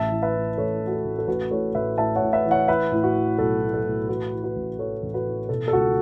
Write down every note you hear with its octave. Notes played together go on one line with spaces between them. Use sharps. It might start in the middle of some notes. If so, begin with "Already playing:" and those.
Already playing: A1 E5 A5
E3
B4 E5
A2
A1 A4 C#5
E3
F#4
A4
A1
A4
A1 F#4 B4
A2 A4 C#5
A1 B4 E5
A2 E5 A5
C#5 F#5
A2
B4 E5
E3
C#5 F#5
E3 B4 E5
A2
F#4
E3
B1 A4
A2
A4
A2
E3 F#4 B4
E3
F#4 B4
A1
E3 A4 C#5
A1
F#4 B4
E3
B2 A4
A4
C#2 F#4